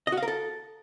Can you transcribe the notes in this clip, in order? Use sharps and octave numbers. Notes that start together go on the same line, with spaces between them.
D#5
F#4
F5
A#4
A4